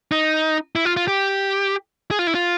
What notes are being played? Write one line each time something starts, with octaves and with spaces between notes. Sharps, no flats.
D#4
E4
F4
F4
G4
G#4
F4
E4
F4